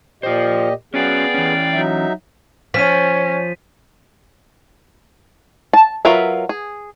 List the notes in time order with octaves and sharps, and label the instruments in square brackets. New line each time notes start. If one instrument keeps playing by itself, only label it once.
[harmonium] A#2 G4 D#5 [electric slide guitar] F4 C5
[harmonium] B3 G#4 [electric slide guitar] C#4 F#4 [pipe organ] D5 F5 G5
[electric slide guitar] E3 C#4
[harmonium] F#3 D#4 E5
[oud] F3 [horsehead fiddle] C#4 [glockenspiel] B6 D#7
[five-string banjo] A5
F#3 F4 A#4 B4 E5
G#4